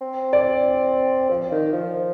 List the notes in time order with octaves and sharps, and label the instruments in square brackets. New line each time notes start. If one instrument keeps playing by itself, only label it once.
[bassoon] C4
[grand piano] D5
[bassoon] F3 [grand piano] C5
[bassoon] D#3
F3